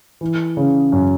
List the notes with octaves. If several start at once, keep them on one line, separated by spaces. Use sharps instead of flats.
E3
C#3
F#2